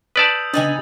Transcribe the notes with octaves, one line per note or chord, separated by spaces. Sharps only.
B4 D5 A5 D#6 E6 G6
C#3 B3 D4 D#4 G#5 D#6 A6 F#7